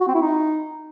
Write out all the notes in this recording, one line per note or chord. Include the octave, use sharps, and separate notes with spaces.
F#4
C4
E4
D#4